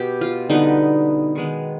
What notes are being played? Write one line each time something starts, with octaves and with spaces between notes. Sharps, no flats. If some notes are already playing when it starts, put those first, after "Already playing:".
Already playing: B2 B3 G4
F4
D3 G3 B3 D#4
D#3 G#3 B3